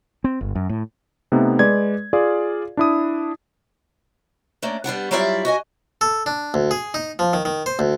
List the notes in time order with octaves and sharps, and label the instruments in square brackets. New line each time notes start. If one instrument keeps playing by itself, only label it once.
[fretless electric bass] C4
G1
F#2
A2
[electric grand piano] C3 A3 B3 D#4
G#3 B4 D5 G#6
F4 G#4 D5 F5
D4 E4 D#6
[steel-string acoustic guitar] A3 A#3 C#4 D4
G3 B3 D4 F#5
F#3 G3 E4 F4 D5 E5
F#4 D#5 G#5
[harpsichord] A4
D4
D2
G#4
D#4
F3
D#3
D#3
C5
D2